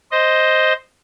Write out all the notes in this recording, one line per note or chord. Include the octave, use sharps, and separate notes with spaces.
C5 D#5